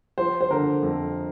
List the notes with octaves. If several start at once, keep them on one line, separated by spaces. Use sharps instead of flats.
F3 C5
C5
D3 A#4
F2